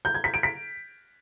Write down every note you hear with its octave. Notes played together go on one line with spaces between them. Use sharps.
G6
G#6
B6
D7
B6